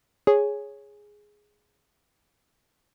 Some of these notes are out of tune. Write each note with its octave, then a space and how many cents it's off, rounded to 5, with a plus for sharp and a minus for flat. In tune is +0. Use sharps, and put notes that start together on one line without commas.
G#4 +0 C#5 +0